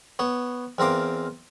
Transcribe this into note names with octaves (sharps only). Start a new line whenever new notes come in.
B3 C#5
E2 C4 A#4 F5 D6